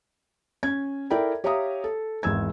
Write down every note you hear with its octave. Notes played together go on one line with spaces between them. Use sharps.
C#4 G#6
E4 A4 A#4 D5 G5 B5
G4 C#5 E5 F5 A#5 D#6
A4
G#1 E2 E6 G#6